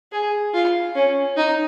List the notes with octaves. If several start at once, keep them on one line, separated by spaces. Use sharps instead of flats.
G#4
F4
C#4
D#4